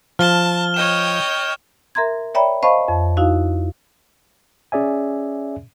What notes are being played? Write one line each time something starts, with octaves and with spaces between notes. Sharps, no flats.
F3 A5 F6 G7
C#5 D#5 G5 E7
A#4 E5 A#5 C6 G#6
C#5 D5 E5 G5 A#5 B5
C5 D#5 F5 A5 B5 C#6
F2
D#4 E4 F#4 F5
C#4 G#4 D5 E5 G#5